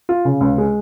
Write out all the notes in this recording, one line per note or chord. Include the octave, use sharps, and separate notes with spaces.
F4
C#3
C#2
G#3